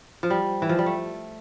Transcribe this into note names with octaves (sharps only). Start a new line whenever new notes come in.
F3
G3
E3
F3
G3
A3